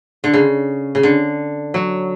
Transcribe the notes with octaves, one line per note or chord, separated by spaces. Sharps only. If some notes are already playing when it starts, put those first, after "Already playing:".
D3
C#3
C#3
D3
F#3